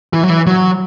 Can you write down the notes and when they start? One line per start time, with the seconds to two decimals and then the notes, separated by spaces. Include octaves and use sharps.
0.13 E3
0.23 F#3
0.30 E3
0.47 F#3